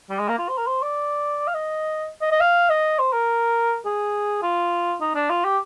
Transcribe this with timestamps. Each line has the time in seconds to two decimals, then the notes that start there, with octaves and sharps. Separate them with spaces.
0.10 G3
0.19 G#3
0.29 A#3
0.38 F4
0.49 C5
0.58 A#4
0.67 C5
0.82 D5
1.47 F5
1.54 D#5
2.21 D#5
2.32 D#5
2.41 F5
2.70 D#5
2.99 C5
3.13 A#4
3.85 G#4
4.43 F4
5.00 D#4
5.15 D4
5.30 F4
5.44 G4